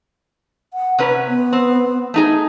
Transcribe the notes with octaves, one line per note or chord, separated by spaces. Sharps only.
F#5
C3 C#4 B4
B3
C4
A3 D#4 G#4